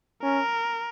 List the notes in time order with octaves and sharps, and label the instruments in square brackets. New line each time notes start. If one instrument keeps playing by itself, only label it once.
[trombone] C#4 [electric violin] A#4